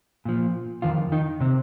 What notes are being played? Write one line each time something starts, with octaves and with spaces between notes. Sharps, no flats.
A#2 F3
F2 D#3 F4
D#3 D#4
C3 C4